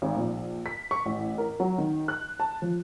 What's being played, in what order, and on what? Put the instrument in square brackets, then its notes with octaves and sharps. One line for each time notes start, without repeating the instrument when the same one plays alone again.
[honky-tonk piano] G#1
A#1
B6
C#6
A1
A#4
F#3
D#3
F#6
A5
F3